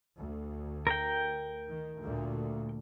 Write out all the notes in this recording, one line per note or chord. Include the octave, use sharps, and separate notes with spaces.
D2
A#4 G5
D#3
D2 A#2